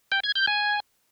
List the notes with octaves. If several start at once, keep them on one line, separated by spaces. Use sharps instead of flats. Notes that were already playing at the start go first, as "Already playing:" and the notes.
G5
G#6
G6
G#5